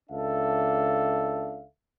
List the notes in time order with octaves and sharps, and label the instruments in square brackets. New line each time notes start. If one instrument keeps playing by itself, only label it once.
[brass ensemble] C#2 D4 A4 E5 F5